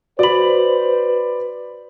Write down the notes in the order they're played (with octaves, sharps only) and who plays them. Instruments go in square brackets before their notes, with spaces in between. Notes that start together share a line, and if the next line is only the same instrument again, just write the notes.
[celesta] F#4 F#7 [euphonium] B4 [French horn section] C5 [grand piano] D5 B5